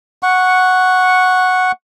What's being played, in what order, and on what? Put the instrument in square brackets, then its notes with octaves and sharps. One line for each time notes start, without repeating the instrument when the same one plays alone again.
[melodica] F#5 C#6